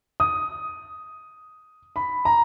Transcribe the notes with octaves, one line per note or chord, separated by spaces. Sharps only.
D#6
B5
A#5